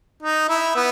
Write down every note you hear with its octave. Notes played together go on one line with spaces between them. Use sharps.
D#4
E4
B3